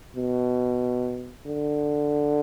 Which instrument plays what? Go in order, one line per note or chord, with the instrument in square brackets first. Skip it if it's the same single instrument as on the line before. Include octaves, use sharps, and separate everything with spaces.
[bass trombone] B2
D3